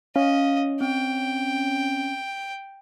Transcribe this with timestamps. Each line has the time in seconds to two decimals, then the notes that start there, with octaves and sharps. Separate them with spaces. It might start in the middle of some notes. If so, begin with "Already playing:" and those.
0.16 C#4 D#5 F5
0.81 C4 G5